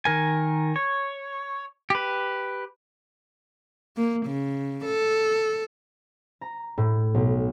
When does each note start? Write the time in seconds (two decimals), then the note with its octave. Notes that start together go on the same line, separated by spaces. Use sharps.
0.05 D#3 A#4 G#5
0.76 C#5
1.90 G4 B4
3.97 A#3
4.26 C#3
4.85 A4
6.41 A#5
6.78 A2
7.14 B1